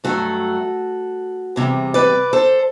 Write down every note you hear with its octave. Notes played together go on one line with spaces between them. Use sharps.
G2 F#3 A3 F#4 A4
E2 C3 G3
B4 D5
A4 C5